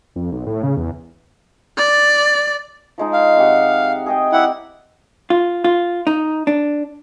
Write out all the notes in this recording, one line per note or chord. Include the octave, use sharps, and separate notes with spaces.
F2
B1
A2
C#3
E2
D5
F3 G#3 D#4
F5
C3 G4 F#5
G#4 D#5 G5
E4 D5 F#5 G5
F4
F4
D#4
D4